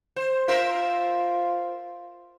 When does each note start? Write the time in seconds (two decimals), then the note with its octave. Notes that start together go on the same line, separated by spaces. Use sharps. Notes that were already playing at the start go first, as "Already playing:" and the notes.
0.16 C5
0.48 F4 A#4 C5 E5